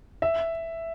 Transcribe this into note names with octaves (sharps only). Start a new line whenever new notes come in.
E5